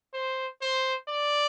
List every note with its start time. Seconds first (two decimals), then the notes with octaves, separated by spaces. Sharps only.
0.14 C5
0.61 C5
1.08 D5